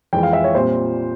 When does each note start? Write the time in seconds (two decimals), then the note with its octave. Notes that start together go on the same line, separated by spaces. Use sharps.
0.13 F2 E3 G#3 G5
0.23 F5
0.33 E5
0.44 C#5
0.54 A#2 G3 C4 C5